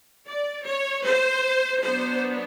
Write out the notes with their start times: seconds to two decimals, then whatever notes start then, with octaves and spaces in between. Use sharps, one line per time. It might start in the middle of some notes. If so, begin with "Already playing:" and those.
0.26 D5
0.65 C#5
1.05 C5
1.82 F#3 B3 D4 C5